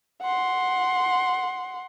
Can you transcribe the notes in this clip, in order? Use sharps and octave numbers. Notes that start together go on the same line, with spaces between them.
F#5 C6